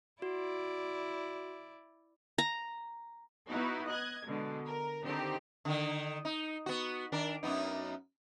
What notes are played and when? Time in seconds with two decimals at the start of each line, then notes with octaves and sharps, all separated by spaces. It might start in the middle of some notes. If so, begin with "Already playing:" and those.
0.22 E4 F#4 D5
2.38 A#5
3.49 B3 D#4 E4 F#4
3.87 D#5 F#6 G#6
4.27 B2 D3 G#3
4.68 A#4
5.05 D3 D#3 C4 D#4 G4 C5
5.65 D3 D#3
6.25 D#4
6.66 B3 F#4
7.12 D#3 D4 A#4
7.43 F#2 B3 D#4